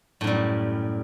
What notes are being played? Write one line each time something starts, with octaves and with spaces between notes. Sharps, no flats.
F#2 A2 G3